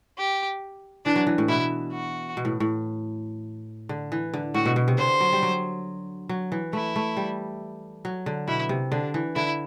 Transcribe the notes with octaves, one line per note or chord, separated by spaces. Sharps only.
G4
E3 D4
F#3
E3
A2
B2 E4
F#4
B2
A2
A2
D3
E3
D3
A2 F#4
B2
B2
C3
D3 C5
F#3
G3
F#3
F#3
E3
A3 E4
A3
G3
F#3
D3
B2 E4
C3
D3 D4
E3
D3 E4